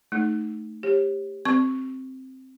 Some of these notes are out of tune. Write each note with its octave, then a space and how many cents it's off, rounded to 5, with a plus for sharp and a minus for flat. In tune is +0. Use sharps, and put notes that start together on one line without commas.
A3 +0 D#4 +0
G4 +15 C#5 -30
C4 +0 C#6 +0